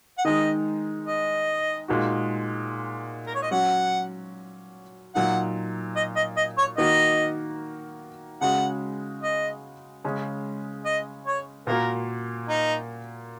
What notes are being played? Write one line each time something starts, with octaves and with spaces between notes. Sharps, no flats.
F#5
D#3 G#3 D#4 D#5
D#5
A#2 G#3 D#4 F#4
A#4
C#5
D#5
F#3 C#4 F#4 F#5
A#2 F#3 D#4 F#5
D#5
D#5
D#5
C#5
D#3 A#3 F#4 D#5
C#3 G#3 C#4 F#4 F#5
D#5
C#3 G#3 C#4
D#5
C#5
A#2 A#3 F#4 A#4
D#4